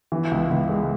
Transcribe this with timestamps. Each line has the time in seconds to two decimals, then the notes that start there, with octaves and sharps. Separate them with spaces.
0.12 E3
0.31 C#2
0.50 C#2
0.69 G#3